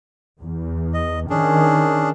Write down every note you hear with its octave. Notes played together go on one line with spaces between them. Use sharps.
E2
D#5
D#3 C#4 D4 G#4